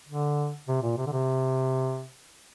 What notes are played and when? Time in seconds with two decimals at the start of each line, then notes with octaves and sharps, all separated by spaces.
0.09 D3
0.68 C3
0.83 A#2
0.98 C3
1.06 D3
1.12 C3